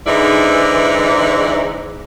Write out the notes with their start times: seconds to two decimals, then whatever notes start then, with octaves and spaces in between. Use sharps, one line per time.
0.07 G#2 D3 E3 D#4 E4 D5